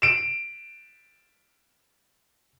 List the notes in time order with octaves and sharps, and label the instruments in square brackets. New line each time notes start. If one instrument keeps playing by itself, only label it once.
[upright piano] D7 E7